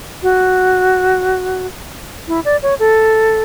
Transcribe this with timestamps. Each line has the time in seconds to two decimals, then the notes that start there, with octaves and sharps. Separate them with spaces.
0.22 F#4
2.28 E4
2.45 D5
2.62 C#5
2.79 A4